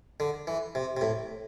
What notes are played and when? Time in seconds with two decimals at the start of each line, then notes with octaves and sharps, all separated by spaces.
0.20 D3
0.47 E3
0.75 C3
0.97 C3
1.01 A2